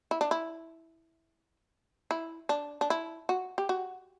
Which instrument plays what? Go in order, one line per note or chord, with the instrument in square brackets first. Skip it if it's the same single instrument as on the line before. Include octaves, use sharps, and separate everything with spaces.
[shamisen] E4
D4
E4
E4
D4
D4
E4
F#4
G4
F#4